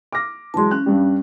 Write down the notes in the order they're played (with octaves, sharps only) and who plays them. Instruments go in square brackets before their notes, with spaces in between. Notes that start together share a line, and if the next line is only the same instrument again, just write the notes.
[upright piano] D6 F6 A#6
[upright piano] E3 F#3 G#3 [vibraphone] A5 C6
[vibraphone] C#4 [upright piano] F#6
[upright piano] G2 G3